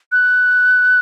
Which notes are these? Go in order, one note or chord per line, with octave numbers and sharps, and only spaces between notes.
F#6